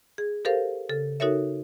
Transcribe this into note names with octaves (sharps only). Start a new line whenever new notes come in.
G#4
G4 A4 A#4 C5 F5
C#3 A4
D#4 F#4 A4 A#4 C#5 E5